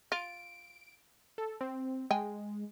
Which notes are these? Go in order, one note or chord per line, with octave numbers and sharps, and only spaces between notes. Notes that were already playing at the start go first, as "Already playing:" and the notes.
F4 D7
A4
C4
G#3 G5 G#5